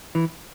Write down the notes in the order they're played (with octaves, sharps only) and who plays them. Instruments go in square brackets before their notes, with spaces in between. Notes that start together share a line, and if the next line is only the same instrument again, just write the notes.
[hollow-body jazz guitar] E3